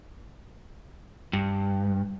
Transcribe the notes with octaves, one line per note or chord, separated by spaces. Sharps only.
G2